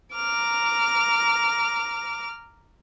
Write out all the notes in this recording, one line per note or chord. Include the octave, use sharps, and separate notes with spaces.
A#5 D6 F6